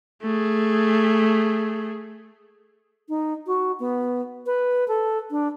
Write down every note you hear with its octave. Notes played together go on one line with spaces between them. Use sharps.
A3 G#4
D#4
F#4
B3
B4
A4
D4